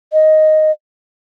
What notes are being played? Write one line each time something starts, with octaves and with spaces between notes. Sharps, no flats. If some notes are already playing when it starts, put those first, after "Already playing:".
D#5